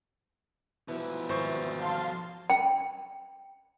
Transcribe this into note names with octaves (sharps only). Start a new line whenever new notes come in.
B2 E3 F3
G#1 C5 C#6
F5 A5 C6
G5